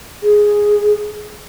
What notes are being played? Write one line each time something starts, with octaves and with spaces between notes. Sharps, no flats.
G#4